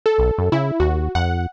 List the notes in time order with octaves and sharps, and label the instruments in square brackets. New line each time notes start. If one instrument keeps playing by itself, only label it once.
[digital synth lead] A4
[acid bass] B1
F#2
[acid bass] C#3 [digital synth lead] E4
[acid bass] D#2 [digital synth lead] F#4
[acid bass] F2 [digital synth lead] F#5